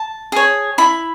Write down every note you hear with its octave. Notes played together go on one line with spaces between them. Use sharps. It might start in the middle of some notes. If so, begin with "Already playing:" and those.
Already playing: A5
G#4 C#5
E4 B5